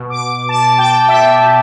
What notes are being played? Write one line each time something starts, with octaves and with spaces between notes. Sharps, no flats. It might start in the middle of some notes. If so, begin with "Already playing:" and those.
Already playing: B2
D6
A5
G5
E5